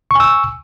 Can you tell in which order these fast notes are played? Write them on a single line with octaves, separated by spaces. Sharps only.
C#6 G#5 E6